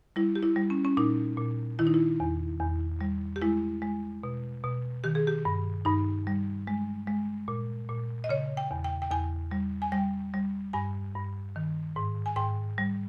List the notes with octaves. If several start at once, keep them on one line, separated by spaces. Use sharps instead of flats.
G3 E4
G4
E4
G3
C#4
C#4
A#2 D#4
A#2
D#3 E4
D#4
E4
E2
E2
G3
G4
G#3 E4
G#3
B2
B2
D#3 G4
G#4
G4
G2
G2 D#4
G3
G#3
G#3
A#2
A#2
D#5
C#3 C#5
G5
E2
G5
G5
E2 G#5
G3
G#5
G3 G5
G3
G2 G#5
G2
D#3
G#2
G#5
G#2 G5
G3